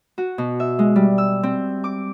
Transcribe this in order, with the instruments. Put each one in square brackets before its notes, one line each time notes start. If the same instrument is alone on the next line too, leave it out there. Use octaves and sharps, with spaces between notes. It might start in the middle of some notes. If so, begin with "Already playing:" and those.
[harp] F#4
B2
E5
G#3
G3
E6
C4
D6